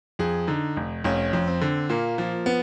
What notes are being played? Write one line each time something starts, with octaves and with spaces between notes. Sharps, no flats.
F2 G#4
D3 D#4
F1
F1 C#4
F2
C4
D3
A#2 A#3
F3 A#3
B3